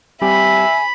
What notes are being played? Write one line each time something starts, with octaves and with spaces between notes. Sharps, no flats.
G3 C4 G4 E5 G#5 B5